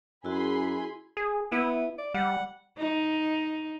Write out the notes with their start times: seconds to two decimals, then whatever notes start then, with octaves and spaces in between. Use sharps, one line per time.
0.25 F#2 E4 F#4 G#4 B5 C6
1.17 G#4
1.52 B3 E4
1.98 D5
2.14 G3 F#5
2.78 D#4